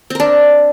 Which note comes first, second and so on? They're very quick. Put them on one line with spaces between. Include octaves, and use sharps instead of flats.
C4 A#4 D4